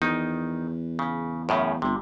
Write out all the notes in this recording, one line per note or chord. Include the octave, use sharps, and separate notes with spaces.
E2 D#3 D#4
C#3
F#2 A2 C#3
G1 C3